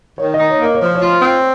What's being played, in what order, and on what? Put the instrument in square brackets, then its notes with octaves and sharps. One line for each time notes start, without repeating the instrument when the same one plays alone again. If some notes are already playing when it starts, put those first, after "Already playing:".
[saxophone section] D#3 [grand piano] C#5
[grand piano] D#5
[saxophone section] D#4
[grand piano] C#5
[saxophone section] A#3
[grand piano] D#5
C#5
[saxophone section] F3 [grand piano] C5
[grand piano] C#5
[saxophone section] F4
C4